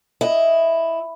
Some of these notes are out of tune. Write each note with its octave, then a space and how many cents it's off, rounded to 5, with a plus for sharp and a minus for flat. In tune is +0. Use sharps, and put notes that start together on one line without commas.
E4 +0 D#5 +0